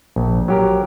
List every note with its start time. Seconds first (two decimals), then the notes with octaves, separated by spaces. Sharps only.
0.16 A#1
0.48 F#3 G4 A#4